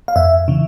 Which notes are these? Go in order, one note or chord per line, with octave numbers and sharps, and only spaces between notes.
F5
F2 E5
C#3 E3